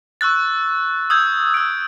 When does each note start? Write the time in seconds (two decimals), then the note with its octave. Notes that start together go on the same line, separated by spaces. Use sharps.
0.21 C#6 E6 F#6 A6
1.10 D#6 E6 G6 G#6
1.54 E6 D7